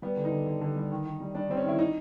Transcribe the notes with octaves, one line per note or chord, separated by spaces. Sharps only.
G3 B3
D3
D#4
D3
D3
D3
G3
D#3
D#3
G3
G3 D4
G3 C4
C#4
D#3 E4
D#4